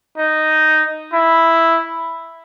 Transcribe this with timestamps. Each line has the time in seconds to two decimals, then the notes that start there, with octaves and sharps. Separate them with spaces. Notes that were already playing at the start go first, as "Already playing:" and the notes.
0.18 D#4
1.13 E4